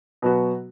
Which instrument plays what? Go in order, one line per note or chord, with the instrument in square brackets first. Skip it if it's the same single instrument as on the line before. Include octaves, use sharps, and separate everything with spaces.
[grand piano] B2 F#3 B3 F#4